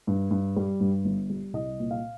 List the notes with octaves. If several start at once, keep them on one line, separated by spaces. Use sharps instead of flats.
G2
G2
G3
G2
G1
G3
C2 D#5
A#2
F5